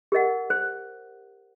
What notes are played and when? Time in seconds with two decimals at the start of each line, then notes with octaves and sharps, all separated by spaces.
0.12 G4 A#4 D#5 F#5
0.50 C5